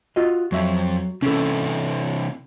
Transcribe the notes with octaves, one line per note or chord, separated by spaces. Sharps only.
F4 F#4 D#5
F2 F#3 E5
C3 E3 C#4 A4